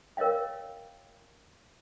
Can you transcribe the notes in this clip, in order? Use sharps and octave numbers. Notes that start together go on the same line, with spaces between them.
A#4 C#5 D#5 F5 G5